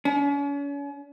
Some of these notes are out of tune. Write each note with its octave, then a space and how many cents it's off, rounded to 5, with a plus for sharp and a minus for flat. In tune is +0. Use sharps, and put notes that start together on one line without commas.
C#4 +40